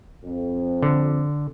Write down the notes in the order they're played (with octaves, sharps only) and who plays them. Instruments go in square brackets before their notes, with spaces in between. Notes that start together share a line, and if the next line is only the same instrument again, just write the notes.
[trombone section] F2
[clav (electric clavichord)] D3